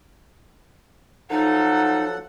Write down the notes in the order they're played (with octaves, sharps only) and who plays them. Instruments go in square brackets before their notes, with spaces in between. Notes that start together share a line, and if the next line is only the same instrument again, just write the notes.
[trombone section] F3 F#3 A4 [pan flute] D#4 [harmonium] F#5